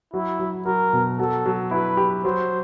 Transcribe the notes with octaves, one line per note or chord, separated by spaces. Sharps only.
F#3 E4
F#3
F#3 A#4
B2
F#3 A4
F#3
E4 B4
G4
F#3 C5